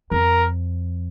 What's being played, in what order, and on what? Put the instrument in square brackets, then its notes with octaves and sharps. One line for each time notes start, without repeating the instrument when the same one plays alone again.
[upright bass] F2 [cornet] A#4